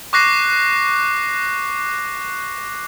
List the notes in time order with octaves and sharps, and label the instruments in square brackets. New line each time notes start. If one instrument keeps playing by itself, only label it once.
[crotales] C#6 D6 F#6 A#6 C7